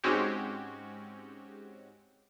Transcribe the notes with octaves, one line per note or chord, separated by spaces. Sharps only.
G#2 G#3 C4 C#4 F#4 G4